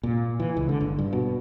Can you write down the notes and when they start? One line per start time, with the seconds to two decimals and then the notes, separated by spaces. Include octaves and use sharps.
0.03 A#2
0.40 E3
0.57 C#2
0.69 D3
0.81 G1
0.99 G2
1.13 B2